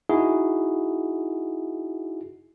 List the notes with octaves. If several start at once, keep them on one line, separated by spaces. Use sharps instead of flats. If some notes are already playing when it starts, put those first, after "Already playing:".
D#4 E4 F#4 G#4